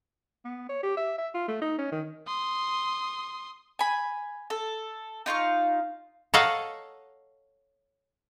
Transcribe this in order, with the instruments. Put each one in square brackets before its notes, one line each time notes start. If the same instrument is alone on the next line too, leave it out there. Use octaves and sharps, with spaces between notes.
[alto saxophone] B3
C#5
G4
E5
E5
F4
A3
D#4
C#4
D#3
[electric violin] C6 D#6
[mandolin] G#5 B5
A4
D#4 F4 F5 C#6
[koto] A4 C#5 D#5 F5 F#5 A#5